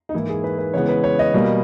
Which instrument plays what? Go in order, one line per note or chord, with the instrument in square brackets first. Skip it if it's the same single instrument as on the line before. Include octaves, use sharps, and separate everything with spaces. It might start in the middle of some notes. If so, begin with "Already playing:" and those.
[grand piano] D#4
G#2 E3 A#3 E4
G#4
B4
B4
C#3 E3 G#3 B3 C#5
B4
C#5
D#5
B2 G3 A#3